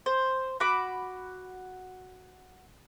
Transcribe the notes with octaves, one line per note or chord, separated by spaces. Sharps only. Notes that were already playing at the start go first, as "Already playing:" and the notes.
C5
F#4 B5 D6